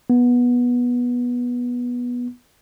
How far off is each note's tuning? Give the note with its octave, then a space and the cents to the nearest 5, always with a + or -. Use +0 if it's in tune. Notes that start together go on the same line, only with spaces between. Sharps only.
B3 -15